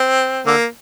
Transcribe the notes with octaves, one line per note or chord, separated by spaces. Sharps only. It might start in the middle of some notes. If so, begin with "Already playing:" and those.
Already playing: C4
D3 A#3